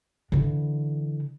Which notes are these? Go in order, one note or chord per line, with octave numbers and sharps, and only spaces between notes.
D3 E3